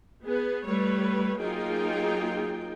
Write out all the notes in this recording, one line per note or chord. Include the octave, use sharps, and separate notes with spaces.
B3 G#4 B4
G3 A3 B4 C#5
F#3 A#3 D#4 F4 G#4 G5